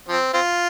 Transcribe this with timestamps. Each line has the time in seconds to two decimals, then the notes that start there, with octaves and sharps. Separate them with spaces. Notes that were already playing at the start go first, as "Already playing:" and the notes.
0.09 F3 C4
0.34 C4 F4